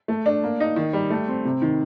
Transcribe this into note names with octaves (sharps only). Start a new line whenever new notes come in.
A3
D4
A#3
D#4
D#3
G3
A3
C4
C3
D#3